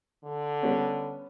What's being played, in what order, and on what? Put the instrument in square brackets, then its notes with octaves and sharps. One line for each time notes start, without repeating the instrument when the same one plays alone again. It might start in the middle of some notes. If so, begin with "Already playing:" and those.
[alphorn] D3
[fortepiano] G3 B3 C#4